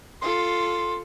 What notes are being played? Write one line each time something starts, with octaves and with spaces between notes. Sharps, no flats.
F4 A4 C6